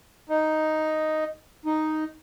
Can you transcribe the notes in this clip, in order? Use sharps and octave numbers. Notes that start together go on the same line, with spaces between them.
D#4
D#4